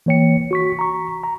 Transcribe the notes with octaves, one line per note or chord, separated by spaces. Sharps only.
E3 A#3 C#5 G5 C#7
F#4 C#6 B6
A#5 C#6
A#5